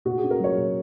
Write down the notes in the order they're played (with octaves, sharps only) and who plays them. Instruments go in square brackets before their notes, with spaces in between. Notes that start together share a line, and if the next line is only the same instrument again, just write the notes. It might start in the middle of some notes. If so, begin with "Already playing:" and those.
[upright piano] A#2 F#4
G#4
C#4
A#4
F#3 C#5
A#2